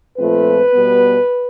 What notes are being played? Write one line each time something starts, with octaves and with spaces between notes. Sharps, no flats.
A#2 F3 A3 C4 B4
B2 G3 B3